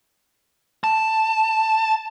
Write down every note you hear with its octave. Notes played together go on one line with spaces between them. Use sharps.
A5